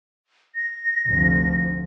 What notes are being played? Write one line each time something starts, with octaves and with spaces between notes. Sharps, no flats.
A#6
F1 D2 F3